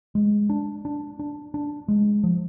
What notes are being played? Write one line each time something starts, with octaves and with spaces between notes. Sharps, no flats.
G#3
D4
D4
D4
D4
G#3
F3